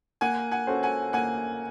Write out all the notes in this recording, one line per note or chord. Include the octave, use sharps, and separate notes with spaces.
A#3 F#5 G#5
F#5 G#5
C#4 F#4 A4 C5
F#5 G#5
A#3 F#5 G#5